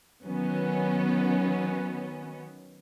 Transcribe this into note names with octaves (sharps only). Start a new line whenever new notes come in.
D#3 F#3 B3 C#4